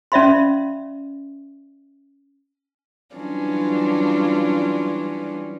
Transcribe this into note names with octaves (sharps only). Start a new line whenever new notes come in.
C#4 D5 E5 F5 B5 C6
E3 F#3 G3 C#4 D4 F4